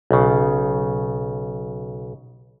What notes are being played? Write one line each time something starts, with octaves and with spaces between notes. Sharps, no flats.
B1 C#3